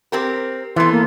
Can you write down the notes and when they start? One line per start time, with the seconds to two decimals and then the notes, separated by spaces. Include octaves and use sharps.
0.12 C4 G4 A#4
0.76 E3 A3 B3 C6
0.92 A#3